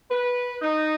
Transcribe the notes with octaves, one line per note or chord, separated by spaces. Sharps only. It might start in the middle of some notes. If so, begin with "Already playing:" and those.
B4
D#4